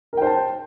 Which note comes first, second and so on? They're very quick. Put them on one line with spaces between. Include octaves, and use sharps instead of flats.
A#4 G5 C5 A5